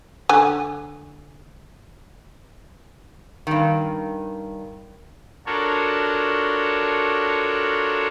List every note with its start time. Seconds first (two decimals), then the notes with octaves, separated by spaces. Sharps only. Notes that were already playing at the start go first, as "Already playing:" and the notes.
0.29 D3 G#5
3.47 G2 D#3
5.46 D4 F4 F#4 A4 A#4 C#5